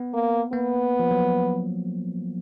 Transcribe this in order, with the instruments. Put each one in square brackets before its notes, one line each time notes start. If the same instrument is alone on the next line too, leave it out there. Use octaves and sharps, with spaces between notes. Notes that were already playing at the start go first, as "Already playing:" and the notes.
Already playing: [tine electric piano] B3
[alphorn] A#3
[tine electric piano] A#3 [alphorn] B3
[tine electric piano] F3
F#3